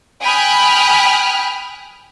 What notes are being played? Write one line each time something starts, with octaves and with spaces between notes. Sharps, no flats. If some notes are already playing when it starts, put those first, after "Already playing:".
G5 G#5 B5 D#6 F6 F#6